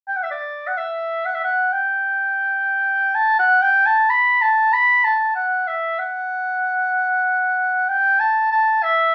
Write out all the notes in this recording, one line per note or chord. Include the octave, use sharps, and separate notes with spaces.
G5
F#5
E5
D5
F#5
E5
F#5
E5
F#5
G5
A5
F#5
G5
A5
B5
A5
B5
A5
F#5
E5
F#5
G5
A5
A5
E5